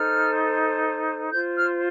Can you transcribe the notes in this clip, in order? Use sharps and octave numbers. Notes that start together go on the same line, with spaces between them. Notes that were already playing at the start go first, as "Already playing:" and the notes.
Already playing: D#4 A4 C5 F6
F4 C5 G6
F6